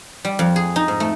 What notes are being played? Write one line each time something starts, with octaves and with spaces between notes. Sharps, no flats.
G3
F2
G#4
D#4
G#2
A3